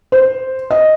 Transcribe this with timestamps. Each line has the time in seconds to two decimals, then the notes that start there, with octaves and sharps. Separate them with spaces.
0.12 C5
0.71 D#5